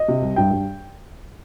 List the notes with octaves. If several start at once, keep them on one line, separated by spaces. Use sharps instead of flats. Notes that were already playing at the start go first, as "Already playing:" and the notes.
Already playing: D#5
C3
C2
G2 G5
G2